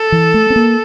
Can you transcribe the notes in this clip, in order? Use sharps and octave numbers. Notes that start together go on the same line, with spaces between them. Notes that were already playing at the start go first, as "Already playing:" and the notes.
Already playing: A4
E3
A3
C4
A#3